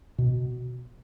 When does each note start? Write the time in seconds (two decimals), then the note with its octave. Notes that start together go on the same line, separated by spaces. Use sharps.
0.18 B2